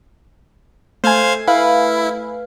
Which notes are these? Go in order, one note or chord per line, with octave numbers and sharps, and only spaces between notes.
A3 C5 F5 G#5 G#6
E4 B4 F5